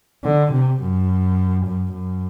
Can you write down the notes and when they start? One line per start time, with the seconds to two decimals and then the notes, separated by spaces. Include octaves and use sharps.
0.24 D3
0.52 C3
0.80 F#2
1.65 F#2
1.93 F#2